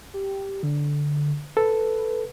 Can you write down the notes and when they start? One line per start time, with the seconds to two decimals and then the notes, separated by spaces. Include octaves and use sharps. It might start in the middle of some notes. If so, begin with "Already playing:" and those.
0.14 G4
0.63 D3
1.57 A4 B4